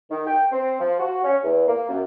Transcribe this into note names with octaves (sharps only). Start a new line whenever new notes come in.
D#3
G5
C4
F3
F#4
C#4
E2
A#3
F#2